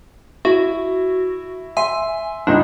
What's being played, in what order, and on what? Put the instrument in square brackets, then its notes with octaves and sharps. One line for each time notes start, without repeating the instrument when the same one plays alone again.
[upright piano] E4 [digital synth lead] F#4
[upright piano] E5 C6 [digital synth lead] G#5
[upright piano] G1 C#2 D#4 [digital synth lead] D4